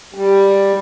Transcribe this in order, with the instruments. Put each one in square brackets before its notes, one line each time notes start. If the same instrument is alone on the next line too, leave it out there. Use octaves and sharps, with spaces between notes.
[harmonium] G3